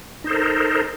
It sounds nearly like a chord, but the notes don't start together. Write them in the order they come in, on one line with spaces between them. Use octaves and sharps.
D#4 C5 A4 A#4